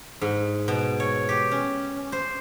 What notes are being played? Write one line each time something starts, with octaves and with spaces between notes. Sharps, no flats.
G#2
B2
C#5
G4
C#4
C5